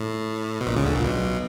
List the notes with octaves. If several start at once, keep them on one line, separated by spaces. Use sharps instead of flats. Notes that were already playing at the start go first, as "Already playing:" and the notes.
Already playing: A2
B2
A#1 A#2
C#2 C#3
D2 D3
A#1 A#2
B1 B2